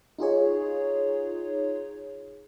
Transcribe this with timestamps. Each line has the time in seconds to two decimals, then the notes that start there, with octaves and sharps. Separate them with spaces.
0.18 D#4 F4 G#4 C#5